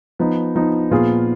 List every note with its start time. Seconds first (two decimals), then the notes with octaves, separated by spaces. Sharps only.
0.19 F3 B3 D#4
0.56 F3 B3 D#4
0.91 A#2 F3 B3 F4 G#4